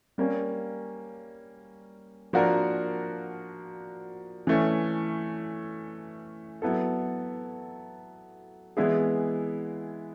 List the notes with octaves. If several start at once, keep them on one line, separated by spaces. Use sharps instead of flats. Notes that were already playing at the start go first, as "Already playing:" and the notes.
G3 A#3 C#4
F3 A#3 D4 F#4 A#4
E3 A3 C#4
F#3 B3 E4 A4
E3 G#3 B3 E4 G#4